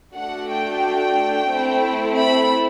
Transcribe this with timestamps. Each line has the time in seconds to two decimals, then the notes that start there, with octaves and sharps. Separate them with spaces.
0.16 A3 D4 F#4 F#5
0.50 G5
1.51 A3 C4 E4
2.18 B5